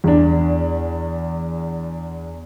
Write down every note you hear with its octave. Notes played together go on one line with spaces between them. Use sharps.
E2 D4